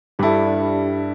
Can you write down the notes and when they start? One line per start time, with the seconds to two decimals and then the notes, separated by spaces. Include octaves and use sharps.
0.19 G2 G3 D4 E4 G4 A4
0.47 D4